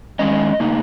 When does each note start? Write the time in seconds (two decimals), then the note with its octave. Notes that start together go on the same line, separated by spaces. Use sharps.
0.19 D#3 G#3 C#4 D#5
0.60 C#3 A#3 D#4